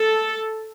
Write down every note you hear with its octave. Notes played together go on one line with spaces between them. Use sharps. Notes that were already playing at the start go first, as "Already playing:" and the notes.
Already playing: A4